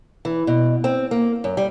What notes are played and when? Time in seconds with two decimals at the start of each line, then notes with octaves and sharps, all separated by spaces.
0.25 E3
0.47 B2
0.84 C4
1.11 A#3
1.44 F#2
1.57 G3